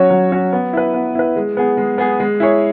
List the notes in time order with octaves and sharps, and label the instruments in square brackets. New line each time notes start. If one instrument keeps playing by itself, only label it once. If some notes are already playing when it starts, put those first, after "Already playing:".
Already playing: [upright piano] F#3 C#4 F#4 C#5
F#3
C#4 F#4 C#5
B3
E4 B4
B3
E4 B4
G#3
B3 G#4
G#3
B3 G#4
G#3
E4 G#4 C#5